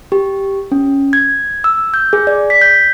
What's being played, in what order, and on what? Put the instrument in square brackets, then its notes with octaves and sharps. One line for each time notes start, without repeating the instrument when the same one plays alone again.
[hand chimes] G4
C#4
G#6
E6
G6
G#4
D5
B6
G6